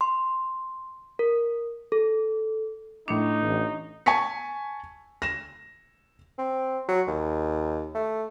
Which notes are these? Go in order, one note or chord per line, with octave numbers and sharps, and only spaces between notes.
C6
A#4
A4
A2 D4 D#4 C#7 F7
A1
G#5 A5 C#6 B6 C#7
A#6 E7
C4
F#3
D#2
A3